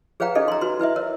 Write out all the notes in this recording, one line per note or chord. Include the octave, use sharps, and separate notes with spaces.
G#4 B4 C#5 F5 G5 A#5
C#4 D#4 G#4 A4 D#5
A#5 C6
F#4 B4 C6
E4 B4 D#5 E5
A#4 C#5